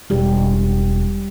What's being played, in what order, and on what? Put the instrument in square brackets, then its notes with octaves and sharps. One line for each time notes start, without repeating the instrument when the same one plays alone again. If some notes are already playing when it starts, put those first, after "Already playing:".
[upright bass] E1 [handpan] G3 G4